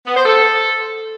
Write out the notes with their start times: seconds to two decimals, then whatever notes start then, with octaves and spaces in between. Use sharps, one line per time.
0.06 B3
0.16 C5
0.26 A4